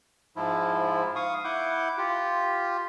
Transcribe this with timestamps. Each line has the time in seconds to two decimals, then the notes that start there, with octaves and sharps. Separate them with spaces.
0.36 G#2 F3 E4
1.16 F5 C#6 D#6
1.44 E4 F#5 D6 G6
1.98 F4 G4